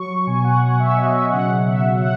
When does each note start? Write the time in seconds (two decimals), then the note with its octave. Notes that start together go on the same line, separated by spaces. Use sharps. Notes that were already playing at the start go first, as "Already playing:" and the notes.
Already playing: F#3 C#6
0.27 B2 G#5
0.44 F#5
0.61 B2 F#5
0.79 E5
0.96 F#3 D#5
1.15 E5
1.26 E5
1.31 C#3 F#5
1.67 F#3 E5
2.01 C#3 F#5